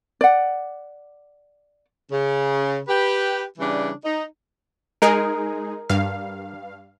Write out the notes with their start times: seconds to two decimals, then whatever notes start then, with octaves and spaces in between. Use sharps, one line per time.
0.21 D5 F#5
2.12 C#3
2.88 G4 B4
3.58 C#3 E3 G3 D4
4.04 D#4
5.02 G#3 D#4 G#4 A#4
5.90 G2 F5